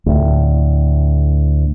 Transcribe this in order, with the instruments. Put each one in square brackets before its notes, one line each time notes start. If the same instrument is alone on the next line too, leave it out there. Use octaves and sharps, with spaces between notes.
[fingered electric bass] D2 A2